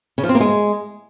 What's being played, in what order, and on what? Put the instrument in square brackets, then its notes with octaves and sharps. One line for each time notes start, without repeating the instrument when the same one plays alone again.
[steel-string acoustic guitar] C#3
F3
C4
A#3
G#3